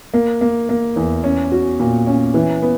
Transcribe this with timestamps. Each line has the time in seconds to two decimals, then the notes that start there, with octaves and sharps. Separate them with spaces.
0.14 A#3
0.41 A#3
0.69 A#3
0.96 E2
1.24 C#4
1.52 F#4
1.80 A#2
2.07 C#4
2.34 E3
2.62 B3